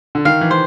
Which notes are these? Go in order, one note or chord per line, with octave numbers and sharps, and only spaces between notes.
D3
D#3 F5
E3
C5